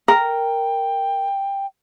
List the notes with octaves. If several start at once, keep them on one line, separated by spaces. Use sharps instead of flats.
A#4 G5